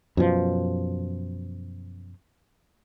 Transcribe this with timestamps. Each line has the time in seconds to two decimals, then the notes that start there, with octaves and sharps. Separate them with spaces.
0.17 F#2 B2 F3